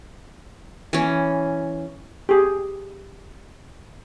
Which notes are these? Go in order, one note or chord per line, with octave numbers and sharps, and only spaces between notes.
E3 C#4
G4 G#4